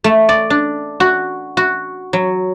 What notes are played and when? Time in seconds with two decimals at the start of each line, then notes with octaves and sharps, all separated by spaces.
0.04 A3
0.29 D5
0.50 D4
1.00 F#4
1.57 F#4
2.13 F#3